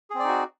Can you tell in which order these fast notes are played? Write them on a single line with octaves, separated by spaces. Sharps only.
G#4 C4 D5 D#4 F#4